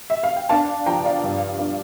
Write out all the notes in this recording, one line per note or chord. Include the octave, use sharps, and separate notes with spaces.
E5
F5
G5
D4 F5 A5
F3 G5 A#5
D5 F5
G2
D4